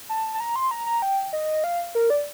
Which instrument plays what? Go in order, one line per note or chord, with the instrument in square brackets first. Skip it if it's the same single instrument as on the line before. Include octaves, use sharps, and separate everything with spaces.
[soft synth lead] A5
A5
A#5
C6
A#5
A#5
G5
D#5
F5
A#4
D5